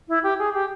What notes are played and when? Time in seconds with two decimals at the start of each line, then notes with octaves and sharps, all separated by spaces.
0.08 E4
0.23 G4
0.39 G#4
0.54 G4